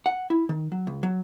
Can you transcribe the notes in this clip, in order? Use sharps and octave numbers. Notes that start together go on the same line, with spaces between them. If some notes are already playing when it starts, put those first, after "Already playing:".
F#5
E4
D#3
F#3
C#2
F#3